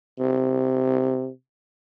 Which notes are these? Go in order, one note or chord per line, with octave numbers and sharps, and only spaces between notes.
C3